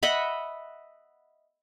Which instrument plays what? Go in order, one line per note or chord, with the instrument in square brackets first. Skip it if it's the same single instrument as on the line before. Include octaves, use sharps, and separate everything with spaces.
[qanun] D#5 E5 F#5 B5